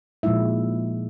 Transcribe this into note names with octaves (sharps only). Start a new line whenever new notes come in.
A#2 F3 G#3 D#4 E4 E5